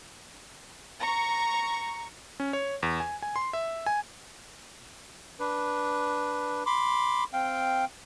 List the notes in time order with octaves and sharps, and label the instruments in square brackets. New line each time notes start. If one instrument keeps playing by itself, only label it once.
[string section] A#5 C#6
[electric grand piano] C#4
C#5
E2
G#5
G#5
C6
E5
G#5
[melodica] D4 B4
B5 C6 D6
C4 F5 G5